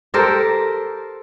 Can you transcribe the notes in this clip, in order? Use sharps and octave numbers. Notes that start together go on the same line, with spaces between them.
G4 A4 A#4 C5